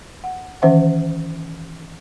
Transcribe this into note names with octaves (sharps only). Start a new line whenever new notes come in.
F#5
D#3 E3 C#4 C5 E5 F#5